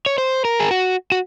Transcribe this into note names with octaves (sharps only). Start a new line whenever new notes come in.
C#5
C5
A#4
G#4
F#4
F#4